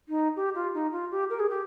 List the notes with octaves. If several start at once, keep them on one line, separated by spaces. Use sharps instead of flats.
D#4
G4
F4
D#4
F4
G4
A#4
G#4
G4